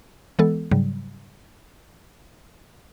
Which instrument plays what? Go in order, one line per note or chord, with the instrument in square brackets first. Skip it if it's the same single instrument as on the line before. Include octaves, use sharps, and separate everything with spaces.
[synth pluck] E3 G#3 B3 A4
G#2 C#3 F#3 G3